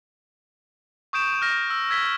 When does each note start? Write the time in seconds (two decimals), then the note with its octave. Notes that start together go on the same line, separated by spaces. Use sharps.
1.13 C#6 D#6 G6 D7 E7
1.42 F6 A#6
1.70 E6
1.90 E6 G#6 A#6 B6 G7